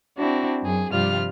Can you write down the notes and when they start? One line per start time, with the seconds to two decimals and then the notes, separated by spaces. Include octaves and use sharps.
0.18 C4 D4 E4 F#4
0.62 F#2 G#4
0.92 G2 C3 F3 G3 F4 F6